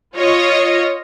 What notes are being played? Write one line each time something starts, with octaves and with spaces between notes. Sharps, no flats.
F4 C#5 D#5